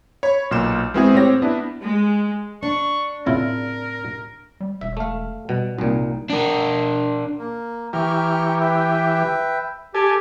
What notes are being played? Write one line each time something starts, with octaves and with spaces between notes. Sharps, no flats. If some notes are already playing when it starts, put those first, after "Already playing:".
C#5 B5
B1 A#2 C6 F6 G6 E7
G#3 B3 C4 E4 F#4 G#4
A2 C4 G4 C#5 A#6
B3 D4 E4
G#3
D4 C#6
A2 C#3 C4 E4 F4 A#4
G3
E1 E5
A3 F5
B2 G3
C2 A#2 D#4
D4 A#4
A#3
E3 G4 A#5 C#6 F6
B4 E5 G5
G4 A4 G#5